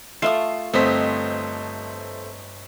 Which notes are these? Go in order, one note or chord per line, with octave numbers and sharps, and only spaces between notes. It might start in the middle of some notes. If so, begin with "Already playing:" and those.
A3 F4 E5 D#6 C7
G1 A3 C4 C5 D#5 B6